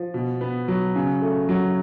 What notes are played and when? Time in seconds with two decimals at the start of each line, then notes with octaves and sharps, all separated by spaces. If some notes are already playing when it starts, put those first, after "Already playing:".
Already playing: F3
0.14 B2
0.41 B3
0.68 F#3
0.95 C#3
1.22 A3
1.49 F#3